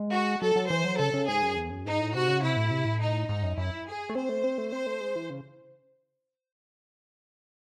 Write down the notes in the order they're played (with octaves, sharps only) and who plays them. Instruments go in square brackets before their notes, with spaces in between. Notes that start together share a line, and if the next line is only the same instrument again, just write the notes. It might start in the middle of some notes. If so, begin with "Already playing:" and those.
Already playing: [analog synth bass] G#3
[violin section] F#4
[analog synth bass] F#3 [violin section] A4
[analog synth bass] F#3
[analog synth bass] E3 [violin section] C5
[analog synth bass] F#3
[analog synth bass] C#3 [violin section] A4
[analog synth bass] C#3
[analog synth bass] G#2 [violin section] G#4
[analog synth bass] F#2
E2
F#2
[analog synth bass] G#2 [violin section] D#4
[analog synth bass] A2
[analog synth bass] C3 [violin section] F#4
[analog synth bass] C#3
[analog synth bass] C3 [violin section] E4
[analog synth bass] A2
C3
A2
[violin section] D#4
[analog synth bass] G#2 [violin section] D#4
[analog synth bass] F#2
[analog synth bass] F#2 [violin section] E4
[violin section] G#4
[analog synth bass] A3
[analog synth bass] C4 [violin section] C5
[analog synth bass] A3
C4
A3
[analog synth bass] C4 [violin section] C5
[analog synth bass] A3
G#3
E3
C#3